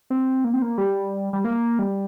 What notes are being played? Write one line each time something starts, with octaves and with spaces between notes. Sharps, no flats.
C4
A#3
C4
A#3
G3
G3
A#3
G3